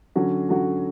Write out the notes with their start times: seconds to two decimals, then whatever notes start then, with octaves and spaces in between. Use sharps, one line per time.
0.16 D3 F#3 C#4 F#4
0.49 D3 F#3 C#4 F#4